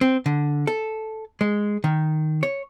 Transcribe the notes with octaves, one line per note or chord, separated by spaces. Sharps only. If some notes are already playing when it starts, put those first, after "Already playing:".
C4
D3
A4
G#3
D#3
C#5